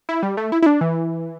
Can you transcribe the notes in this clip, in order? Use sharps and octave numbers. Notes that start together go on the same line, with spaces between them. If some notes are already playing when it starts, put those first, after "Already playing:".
E4
G3
A3
E4
E4
D4
E3